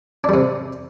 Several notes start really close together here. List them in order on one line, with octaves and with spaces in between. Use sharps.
D4 G3 C3